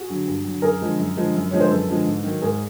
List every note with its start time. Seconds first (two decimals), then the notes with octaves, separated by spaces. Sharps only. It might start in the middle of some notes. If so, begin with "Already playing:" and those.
Already playing: F#4 G#4
0.09 D3 F#3
0.27 G2
0.44 F#3
0.50 D3
0.62 F#2 G#4 A#4
0.81 D3 F3 G#3
0.98 F#2
1.17 D3 F3 G#3
1.35 F#2
1.51 D3 F3 G#3 C#5
1.61 C5
1.71 F#2 A4 B4
1.88 D3 F3 G#3
2.06 G#2
2.24 D#3 F#3
2.42 G#2 G#4 A#4